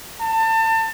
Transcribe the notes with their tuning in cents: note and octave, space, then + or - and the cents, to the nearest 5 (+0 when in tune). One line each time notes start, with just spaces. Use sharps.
A5 +30